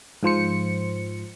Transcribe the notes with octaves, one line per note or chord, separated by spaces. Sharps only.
G#2 F3 C5 C#7